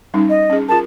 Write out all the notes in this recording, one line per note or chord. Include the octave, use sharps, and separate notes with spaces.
G3 C#4 D#4
D#5
C#4 G#4
F4 G#4 A#4 A5